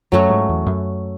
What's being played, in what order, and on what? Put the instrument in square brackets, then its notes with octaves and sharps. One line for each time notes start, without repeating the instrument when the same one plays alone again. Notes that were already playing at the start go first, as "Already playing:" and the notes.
[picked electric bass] F#2 [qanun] F#3 A3 C#4 F#4
[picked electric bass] G#2
E2
F#2